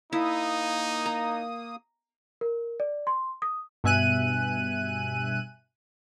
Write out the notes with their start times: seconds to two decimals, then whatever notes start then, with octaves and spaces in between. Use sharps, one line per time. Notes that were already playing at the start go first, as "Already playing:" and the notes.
0.13 A#3 D#4 E4 D#6
1.06 A#5
2.41 A#4
2.80 D5
3.07 C6
3.42 D#6
3.84 G2 B2 E5 G#5 F#6 D#7